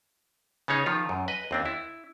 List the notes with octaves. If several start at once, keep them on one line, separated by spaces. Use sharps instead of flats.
C#3 B3 C#4 D#4 G#4 C#5
D#3 F3 F4
F#2
B4 D#5
D#2 C4 D4
E4